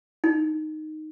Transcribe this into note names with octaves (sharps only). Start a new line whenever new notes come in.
D#4